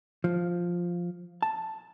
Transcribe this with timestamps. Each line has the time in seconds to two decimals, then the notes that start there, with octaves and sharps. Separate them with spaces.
0.24 F3
1.43 A5